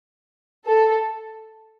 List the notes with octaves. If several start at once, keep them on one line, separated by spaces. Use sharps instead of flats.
A4